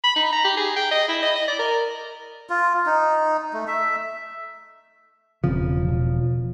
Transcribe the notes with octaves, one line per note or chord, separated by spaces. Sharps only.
B5
D#4
A#5
G4
G#4
G5
D#5
E4
D#5
D#5
D5
A#4
F4
D#4
A3
E5
E1 C#3 F3 C4 C#4
B2